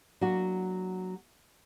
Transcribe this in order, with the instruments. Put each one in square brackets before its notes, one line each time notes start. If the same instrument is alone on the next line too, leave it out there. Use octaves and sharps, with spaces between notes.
[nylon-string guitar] F#3 A#3 D4 F#4